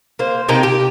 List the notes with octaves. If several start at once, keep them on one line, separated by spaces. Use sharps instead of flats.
A#3 C5
C3 A#3 D#4 G5
G4